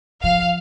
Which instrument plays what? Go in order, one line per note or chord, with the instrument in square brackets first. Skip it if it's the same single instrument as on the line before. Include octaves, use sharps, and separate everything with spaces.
[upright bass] F3 [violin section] F5